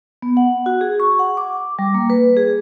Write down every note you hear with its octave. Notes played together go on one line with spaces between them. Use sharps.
B3
F#5
F#4
G#4
C#6
F#5
D6
G3
A#3
B4
G#4